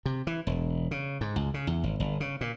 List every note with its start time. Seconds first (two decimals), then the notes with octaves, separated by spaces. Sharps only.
0.06 C3
0.27 E3
0.47 E1
0.91 C#3
1.21 G#2
1.36 C#2
1.54 C#3
1.67 E2
1.84 G#1
2.00 G1
2.20 C#3
2.41 A#2